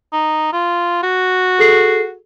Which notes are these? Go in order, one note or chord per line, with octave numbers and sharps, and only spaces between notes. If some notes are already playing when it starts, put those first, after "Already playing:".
D#4
F4
F#4
G#4 A4 C7